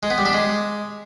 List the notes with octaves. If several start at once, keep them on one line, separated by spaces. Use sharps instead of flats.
G#3
B3
G3
D4
G#3